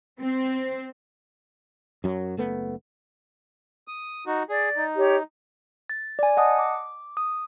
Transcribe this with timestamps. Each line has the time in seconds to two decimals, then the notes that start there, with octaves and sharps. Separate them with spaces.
0.20 C4
2.04 F#2 F#3
2.37 F#1 A3 B3
3.88 D#6
4.27 D#4 F#4
4.50 G#4 D5
4.77 D#4
4.97 G4 C#5
5.90 A6
6.19 D5 G#5
6.37 D#5 F#5 A5 D#6
6.59 D6
7.17 D#6